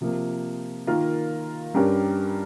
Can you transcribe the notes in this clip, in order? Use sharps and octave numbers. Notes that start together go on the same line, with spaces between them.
C3 F3 A#3
D#3 A#3 F4 A#4
G2 G3 C#4 G4 A#4